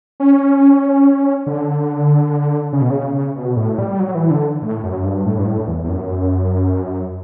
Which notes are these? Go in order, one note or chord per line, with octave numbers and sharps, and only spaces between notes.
C#4
D3
C#3
B2
C#3
B2
A2
G3
F#3
E3
D3
A2
F#2
G2
A2
G2
A2
E2
E2
F#2